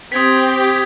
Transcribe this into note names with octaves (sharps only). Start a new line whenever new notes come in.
C4 G4 D#6 G#6 B6